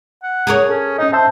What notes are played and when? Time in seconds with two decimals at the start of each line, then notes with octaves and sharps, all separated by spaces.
0.23 F#5
0.47 G#4 A#4 C#5
0.70 C#4 A4
0.99 C#4 D#4 D#5
1.13 C5 E5 A5 E6